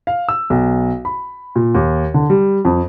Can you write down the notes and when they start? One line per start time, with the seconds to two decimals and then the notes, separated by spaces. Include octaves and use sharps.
0.07 F5
0.29 E6
0.50 B1
1.05 B5
1.56 A#2
1.75 D#2
2.14 D3
2.30 G3
2.65 F2